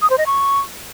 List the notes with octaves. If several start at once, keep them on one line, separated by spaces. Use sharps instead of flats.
D#6
C5
D#5
C#6